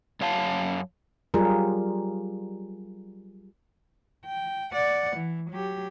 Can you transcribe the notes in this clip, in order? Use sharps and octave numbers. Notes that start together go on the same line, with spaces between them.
F#2 C#5 F5 A5
F#3 G3 F4 G4 G#4 A#4
G5
D5 F#5
E3
F#3 G4